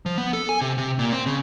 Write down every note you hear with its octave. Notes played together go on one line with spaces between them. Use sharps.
F3
B3
A4
G#5
C3
C3
A#2
C4
C#3